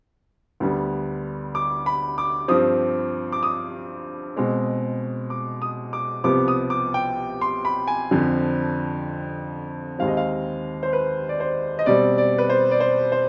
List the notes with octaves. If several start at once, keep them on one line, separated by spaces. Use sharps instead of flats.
D2 D3 G3 B3
D6
B5
D6
G2 F3 C4 D#6
D6
D#6
B2 G#3 C4
D6
D#6
D6
C2 C3 F3 B3 D6
D#6
D6
G5
C6
B5
G#5
F2 D3 F3
D#2 D#3 G#3 C4 F5
D#5
F5
C5
B4
D5
C5
D#5
B2 G3 C4 D5
D5
B4
C5
D5
C5
C5